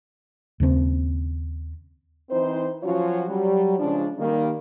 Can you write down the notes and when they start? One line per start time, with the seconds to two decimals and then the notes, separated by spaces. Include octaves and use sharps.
0.60 D#2 C#3 C4
2.30 E3 C4 D#4 C5
2.83 F3 F#3 C#4 F4 F#4 C#5
3.28 F#3 G3
3.78 C#3 F3 G#3 C#4 D4
4.18 D#3 G3 A#3